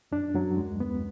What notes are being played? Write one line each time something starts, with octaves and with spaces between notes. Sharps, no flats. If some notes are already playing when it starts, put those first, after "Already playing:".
F#2 D4
F#2 F#3
D#2 G#3
D#2 B3